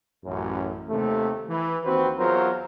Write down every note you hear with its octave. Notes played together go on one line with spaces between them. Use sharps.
A1 F#2
D#2 C3 A3
E3
D#2 C4 F#4 B4 C5
E2 F#3 F4 A#4 C5